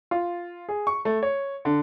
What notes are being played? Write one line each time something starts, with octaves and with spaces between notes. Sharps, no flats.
F4
G#4
C#6
A3
C#5
D3